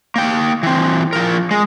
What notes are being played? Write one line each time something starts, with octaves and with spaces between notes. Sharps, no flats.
A#3 G5
E3 C4
F3 A#4
G#3